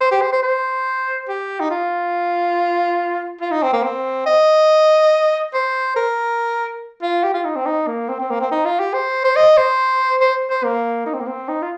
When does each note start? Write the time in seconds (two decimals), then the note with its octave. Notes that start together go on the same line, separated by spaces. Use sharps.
0.01 C5
0.11 G4
0.21 C5
0.32 C5
0.43 C5
1.28 G4
1.60 D#4
1.70 F4
3.41 F4
3.51 D#4
3.63 C4
3.73 A#3
3.83 C4
4.26 D#5
5.54 C5
5.96 A#4
7.02 F4
7.24 G4
7.34 F4
7.45 D#4
7.56 C4
7.66 D#4
7.87 A#3
8.09 C4
8.19 C4
8.30 A#3
8.41 C4
8.51 D#4
8.65 F4
8.79 G4
8.94 C5
9.24 C5
9.36 D#5
9.57 C5
10.21 C5
10.50 C5
10.64 A#3
11.06 D#4
11.14 C4
11.20 A#3
11.28 C4
11.49 D#4
11.62 F4